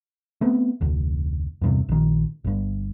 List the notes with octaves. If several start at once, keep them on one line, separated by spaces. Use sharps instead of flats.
A3 B3 C4
F1 D2
E2 G2 C3
A#1 D#3
G1 G2